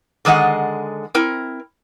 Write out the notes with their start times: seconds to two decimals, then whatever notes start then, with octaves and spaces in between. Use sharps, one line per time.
0.25 D3 D#3 G#3 D#5 F#5
1.15 C4 E4 A#4